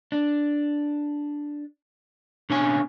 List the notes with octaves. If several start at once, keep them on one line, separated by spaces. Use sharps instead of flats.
D4
B2 C#4 D4 G#5